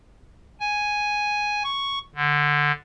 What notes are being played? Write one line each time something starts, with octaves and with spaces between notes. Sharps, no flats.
G#5
C#6
D3